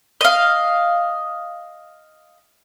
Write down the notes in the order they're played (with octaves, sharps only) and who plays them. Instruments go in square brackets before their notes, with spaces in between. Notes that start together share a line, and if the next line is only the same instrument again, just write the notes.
[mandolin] D#5 F5